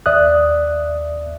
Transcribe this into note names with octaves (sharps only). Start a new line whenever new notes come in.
D#2 D5 E5 D#6 F#6